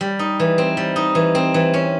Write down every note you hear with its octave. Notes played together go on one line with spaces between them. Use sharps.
G3
D#4
E3
C4
G3
D#4
E3
C4
E3
C#4